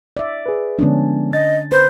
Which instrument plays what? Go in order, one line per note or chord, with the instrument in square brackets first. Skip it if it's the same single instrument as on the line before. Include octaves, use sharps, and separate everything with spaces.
[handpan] D5 E5
[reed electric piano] G#4 B4
[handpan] D3 C#4 D4 [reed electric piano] F3 G#3 B3
[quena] D#5 [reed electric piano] A6
[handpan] B4 [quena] C5